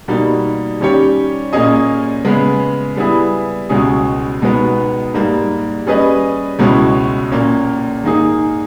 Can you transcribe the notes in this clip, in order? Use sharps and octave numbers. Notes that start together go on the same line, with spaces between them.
B2 G3 A#3 D#4
D#3 G3 C#4 G4 C#5
A#2 A#3 C#4 G#4 D#5
C#3 G#3 B3
G3 B3 E4 G#4
C#2 B2 G#3 C#4 G#4
B2 G#3 B3 D#4
G#2 G3 A#3
G3 C#4 G#4 B4 D#5
C#2 B2 G#3 C#4 E4
A#2 A#3 C#4
G#2 D#3 A#3 D#4 G#4